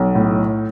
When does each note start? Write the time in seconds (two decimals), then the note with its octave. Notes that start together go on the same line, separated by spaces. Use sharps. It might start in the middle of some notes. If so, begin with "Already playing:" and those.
Already playing: B1
0.15 A2